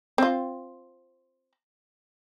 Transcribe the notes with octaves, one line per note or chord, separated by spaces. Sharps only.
C4 F4